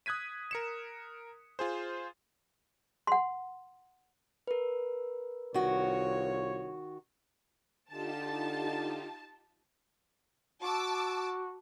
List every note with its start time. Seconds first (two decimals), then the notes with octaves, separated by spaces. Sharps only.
0.06 D#6 F#6 G#6 B6 D#7
0.51 A#4 C#7 E7
1.59 F4 G#4 C5
3.07 F#5 C6
4.47 A#4 B4
5.54 C2 D#3 F4 F#4 C#5
7.91 D3 D#4 F4 G4 A5
10.62 F#4 A5 D6 E6